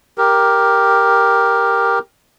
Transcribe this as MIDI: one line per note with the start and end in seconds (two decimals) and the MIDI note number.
0.18 1.99 67
0.18 1.99 70